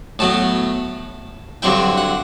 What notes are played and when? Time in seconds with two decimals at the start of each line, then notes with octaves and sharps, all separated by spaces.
0.19 A2 F#3 B3 A5
1.62 G2 D3 F#3 C4 E4 G5
1.98 F#5